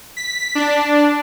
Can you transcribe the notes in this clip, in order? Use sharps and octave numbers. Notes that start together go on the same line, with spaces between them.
B6
D4